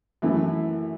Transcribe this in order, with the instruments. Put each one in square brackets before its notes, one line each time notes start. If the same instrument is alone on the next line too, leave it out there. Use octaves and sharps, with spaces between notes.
[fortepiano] F#2 E3 A3 E4